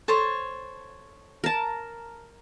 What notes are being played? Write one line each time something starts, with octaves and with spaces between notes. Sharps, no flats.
A4 C5 C#5
A#4 A5